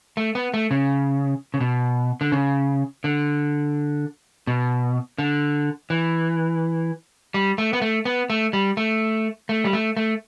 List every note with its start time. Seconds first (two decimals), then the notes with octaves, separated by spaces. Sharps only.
0.17 A3
0.35 B3
0.54 A3
0.71 C#3
1.54 C#3
1.60 B2
2.21 D3
2.32 C#3
3.04 D3
4.47 B2
5.18 D3
5.90 E3
7.34 G3
7.58 A3
7.73 B3
7.82 A3
8.05 B3
8.30 A3
8.53 G3
8.77 A3
9.49 A3
9.64 G3
9.73 A3
9.97 A3